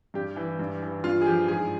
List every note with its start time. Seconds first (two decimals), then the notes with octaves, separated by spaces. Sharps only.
0.14 G2 G4
0.36 E3
0.59 G2
0.82 E3
1.04 G2 F4
1.21 G#4
1.26 F3 G4
1.48 G#2 G#4